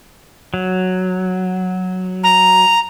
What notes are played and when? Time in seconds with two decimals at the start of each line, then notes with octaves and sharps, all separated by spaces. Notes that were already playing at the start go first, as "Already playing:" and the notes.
0.54 F#3
2.24 A#5